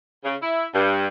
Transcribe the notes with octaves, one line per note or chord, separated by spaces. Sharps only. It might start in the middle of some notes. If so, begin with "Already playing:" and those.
C#3
E4
G2